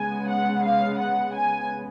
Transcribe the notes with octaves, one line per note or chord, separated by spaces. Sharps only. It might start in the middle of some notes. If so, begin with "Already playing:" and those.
Already playing: C#3 G#3 B3 G#5
F#5
F5
F#5
G#5